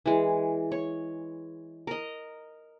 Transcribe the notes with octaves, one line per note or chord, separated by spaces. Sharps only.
E3 G#3
C#5
A#4 D#5